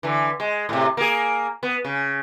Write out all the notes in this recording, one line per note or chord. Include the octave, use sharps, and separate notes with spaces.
D3 E3
G#3
A2 C3
A#3 G#4
B3
C#3